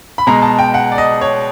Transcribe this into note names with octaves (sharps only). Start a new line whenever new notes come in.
B5
B2 G#3 A#5
A5
G5
F#5
D5
D#5
C#5